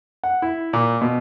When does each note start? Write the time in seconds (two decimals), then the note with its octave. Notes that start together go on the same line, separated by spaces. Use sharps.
0.24 F#5
0.42 E4
0.73 A#2
1.01 B2